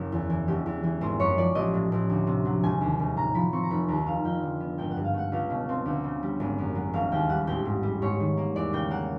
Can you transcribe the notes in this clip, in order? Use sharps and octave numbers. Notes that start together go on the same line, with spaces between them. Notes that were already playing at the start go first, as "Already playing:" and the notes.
Already playing: F#1 C#3
E2
E3
E1 G4
E2
E3
G#1 C5
F#2 C#5
F3 D5
A1 D#5
A2
A1
D2
C3
F#3
E1 G#5
D#2
E1
A2 A#5
F3 B5
C4 C#6
A#5
F1 B5
D#2 A#5
F1 F5
F2 G5
D3
B3
G#1 G5
F#5
G2
F5
A3 F#5
C#2 F5
B2
C4
D2
C#3
G3
G#1
F#2
F#3
E1 F5
D#2 G5
G3 F#5
A1 G5
G#2
G3
G#2 C#5
D#3
A#3
E2 D5
C#3 G5
A#3 F#5